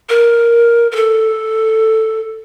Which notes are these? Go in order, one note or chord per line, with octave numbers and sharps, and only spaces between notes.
A#4
A#4
A4